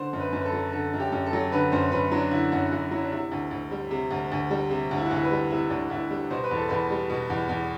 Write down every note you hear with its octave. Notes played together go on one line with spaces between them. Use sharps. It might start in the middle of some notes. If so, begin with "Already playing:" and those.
Already playing: D3 C5
F#2
B4
F#2
B4
A4
F#3
D3 A4
F#2
G4
F#2
A4
F#3
D3 B4
F#2 C5
F#2 B4
F#3 D4
D3 E4
F#2 F#4
F#2 F#4
F#3 E4
D4
C3 E4
D2
D2
G3
C3
D2
D2
G3
C3
D2
E4
F#4
D2 E4
B4
G3
C3 E4
D2 D4
D2 E4
G3
B2 C5
B4
E2 A4
E2 B4
G3
B2
E2
E2